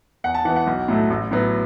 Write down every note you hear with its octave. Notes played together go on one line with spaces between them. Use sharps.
E2 F#5
A5
E3 B3 F#5
F#5
B1
A2 F#3 A3
A1
A2 F#3 B3